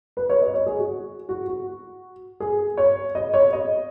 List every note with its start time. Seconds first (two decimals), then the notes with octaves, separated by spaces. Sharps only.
0.17 B4
0.30 C#5
0.42 D#5
0.54 C#5
0.66 G#4
0.79 F#4
1.29 F#4
1.47 F#4
2.40 G#4
2.77 C#5
3.15 D#5
3.34 C#5
3.53 D#5